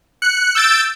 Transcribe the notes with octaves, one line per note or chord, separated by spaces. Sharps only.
F#6 C#7
E6 G6 A6 D7